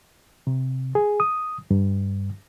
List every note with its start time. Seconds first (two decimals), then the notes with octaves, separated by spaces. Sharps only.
0.47 C3
0.95 G#4
1.20 D#6
1.71 G2